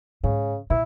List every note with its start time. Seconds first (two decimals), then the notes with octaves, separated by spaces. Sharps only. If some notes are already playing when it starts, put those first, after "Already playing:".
0.24 G#2 C#3
0.70 A#2 E4